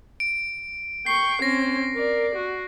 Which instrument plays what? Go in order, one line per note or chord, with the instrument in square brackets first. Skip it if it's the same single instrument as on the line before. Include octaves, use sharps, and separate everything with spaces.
[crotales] D7
[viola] G5 C#6 [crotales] C7
[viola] C4 C#4 [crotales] A#6
[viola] A#4 D5
F#4